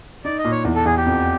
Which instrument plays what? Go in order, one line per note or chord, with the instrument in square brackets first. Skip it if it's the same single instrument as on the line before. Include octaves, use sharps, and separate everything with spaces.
[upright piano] D#4 [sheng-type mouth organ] D5
[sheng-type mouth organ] D#5
[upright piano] A#2
[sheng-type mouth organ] C#5
[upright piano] E2
[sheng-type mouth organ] A4
[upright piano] E2 [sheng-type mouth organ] G#4
[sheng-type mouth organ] G4
[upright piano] F2